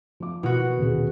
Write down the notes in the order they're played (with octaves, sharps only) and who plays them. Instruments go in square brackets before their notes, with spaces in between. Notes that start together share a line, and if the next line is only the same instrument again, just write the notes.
[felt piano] F3 D6
[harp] B2 F#4 [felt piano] E3
[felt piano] D#1 G#4